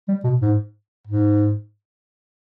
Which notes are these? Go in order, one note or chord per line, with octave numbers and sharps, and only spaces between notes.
G3
B2
G#2
G#2